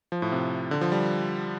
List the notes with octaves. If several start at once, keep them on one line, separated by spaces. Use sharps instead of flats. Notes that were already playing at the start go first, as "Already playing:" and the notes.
F3
A2
C3
D3
F3
G3